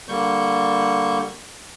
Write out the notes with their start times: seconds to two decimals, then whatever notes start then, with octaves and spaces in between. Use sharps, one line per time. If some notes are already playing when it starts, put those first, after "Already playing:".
0.09 D3 G3 A#3 C#6 G6